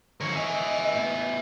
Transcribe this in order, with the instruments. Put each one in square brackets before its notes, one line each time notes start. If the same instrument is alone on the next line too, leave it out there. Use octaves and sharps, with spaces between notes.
[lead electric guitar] D3 F3 [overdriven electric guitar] A#4 C#5
[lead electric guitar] E2 D#5 [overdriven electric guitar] E5 G#5
[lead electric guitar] A2 B3